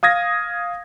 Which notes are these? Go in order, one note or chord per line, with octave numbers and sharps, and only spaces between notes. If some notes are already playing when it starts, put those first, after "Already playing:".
F5 D#6 G#6 A#6